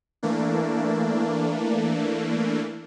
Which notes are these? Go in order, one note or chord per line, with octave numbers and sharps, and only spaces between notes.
E3 A3 A#3 D4